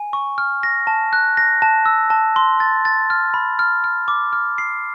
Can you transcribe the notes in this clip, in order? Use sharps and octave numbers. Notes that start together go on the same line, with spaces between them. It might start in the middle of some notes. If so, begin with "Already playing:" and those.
Already playing: G#5
C#6
F6
A#6
A5
F#6
A#6
A5
E6
A5
C6
A6
A6
F6
B5
F6
F6
D6
F6
C7